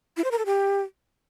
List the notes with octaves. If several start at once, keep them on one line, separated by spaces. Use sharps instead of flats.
E4
C5
A#4
A4
G4